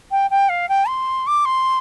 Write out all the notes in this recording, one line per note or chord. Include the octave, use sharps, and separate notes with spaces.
G5
G5
F5
G5
C6
D6
C6